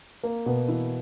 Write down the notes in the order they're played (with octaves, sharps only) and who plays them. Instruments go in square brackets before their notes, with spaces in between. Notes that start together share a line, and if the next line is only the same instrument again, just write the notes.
[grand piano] A#3
B2 B3
E3 E4